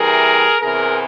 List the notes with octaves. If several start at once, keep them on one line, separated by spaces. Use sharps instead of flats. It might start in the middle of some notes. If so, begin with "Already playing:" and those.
Already playing: C3 E3 G3 G#4 A#4
E2 C3 E3 G#4 A#4